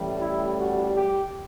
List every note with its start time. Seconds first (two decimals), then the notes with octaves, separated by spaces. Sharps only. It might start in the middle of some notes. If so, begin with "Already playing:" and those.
Already playing: A1 A2 E3 G3
0.21 E4
0.58 F#4
0.95 G4